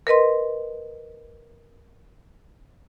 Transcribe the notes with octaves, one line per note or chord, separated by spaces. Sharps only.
A#4 B4 D#5 C6